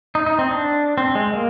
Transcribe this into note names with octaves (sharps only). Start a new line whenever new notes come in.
D#4
D#4
C4
D4
C4
G#3
A#3